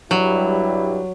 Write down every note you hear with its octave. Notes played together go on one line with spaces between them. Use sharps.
G2 F#3 G3 E4